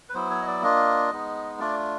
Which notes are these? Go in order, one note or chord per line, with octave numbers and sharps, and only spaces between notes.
B4
F#3 B3 E4 C5
C#5
D#5
D5
A#3 D4 F4 D#5
G#3 B3 D#4
A3 D4 F4 D5